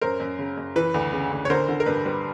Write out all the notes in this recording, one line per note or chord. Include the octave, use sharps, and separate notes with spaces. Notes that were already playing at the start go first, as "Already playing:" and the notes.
F#2 A#4 C5
F#2
C#3
F#2
E3 B4
D2
C#3
D2
C#5
D3 A#4 C5
D3
A#4
G2 B4
G3 B4